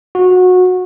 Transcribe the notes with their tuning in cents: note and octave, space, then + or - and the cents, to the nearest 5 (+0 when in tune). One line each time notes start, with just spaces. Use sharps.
F#4 -20